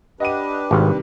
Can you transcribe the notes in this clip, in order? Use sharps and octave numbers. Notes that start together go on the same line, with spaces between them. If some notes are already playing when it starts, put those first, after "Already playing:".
D4 G4 B4 D#5 F#5 D#7
G#1 C3 D#3 G3